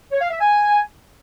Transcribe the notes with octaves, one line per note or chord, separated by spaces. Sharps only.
C#5
F5
E5
G#5